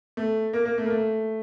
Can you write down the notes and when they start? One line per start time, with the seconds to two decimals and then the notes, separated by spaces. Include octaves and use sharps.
0.17 A3
0.53 A#3
0.65 A#3
0.78 A3
0.86 A#3
0.90 A3